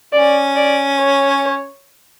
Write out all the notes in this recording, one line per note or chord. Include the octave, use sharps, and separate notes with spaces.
C#4 D5
D5
C#5